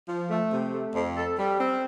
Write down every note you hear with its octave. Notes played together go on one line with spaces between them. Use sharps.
F3
A3
C3
A3
F2
A4
G3
C4